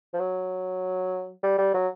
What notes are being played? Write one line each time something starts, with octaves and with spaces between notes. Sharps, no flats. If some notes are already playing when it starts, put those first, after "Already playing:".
F3
F#3
G3
G3
F#3